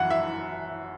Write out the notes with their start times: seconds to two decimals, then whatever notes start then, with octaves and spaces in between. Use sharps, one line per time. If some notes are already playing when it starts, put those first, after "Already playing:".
Already playing: F#2 E3 F#5
0.10 E5